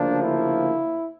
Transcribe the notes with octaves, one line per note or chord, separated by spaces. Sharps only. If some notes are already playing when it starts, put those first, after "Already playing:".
Already playing: D2 C#3 F3 A#3 D4
E4